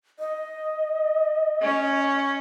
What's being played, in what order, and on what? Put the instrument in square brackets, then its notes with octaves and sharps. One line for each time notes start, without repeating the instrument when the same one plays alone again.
[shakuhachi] D#5
[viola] C#4